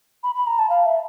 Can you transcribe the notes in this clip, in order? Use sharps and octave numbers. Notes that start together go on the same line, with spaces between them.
B5
B5
A#5
A5
F5
E5